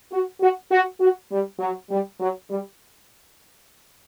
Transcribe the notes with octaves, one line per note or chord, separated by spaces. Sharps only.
F#4
F#4
F#4
F#4
G3
F#3
G3
F#3
G3